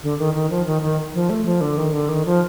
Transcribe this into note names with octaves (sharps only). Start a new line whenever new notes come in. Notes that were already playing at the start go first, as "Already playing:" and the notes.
D3
D#3
D#3
F3
D#3
D#3
F3
A3
F3
D3
D#3
D3
D#3
F3